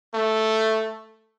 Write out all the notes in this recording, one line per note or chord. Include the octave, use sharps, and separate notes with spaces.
A3